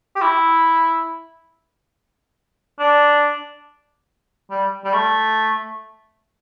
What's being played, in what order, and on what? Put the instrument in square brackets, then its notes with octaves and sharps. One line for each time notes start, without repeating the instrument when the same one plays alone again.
[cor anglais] G4
E4
D4
G3
G3
A3